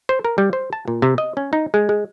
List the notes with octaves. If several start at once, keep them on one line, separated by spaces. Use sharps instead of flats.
C5
A#4
G3
C5
A5
A#2
C3
D#5
C#4
D#4
G#3
G#3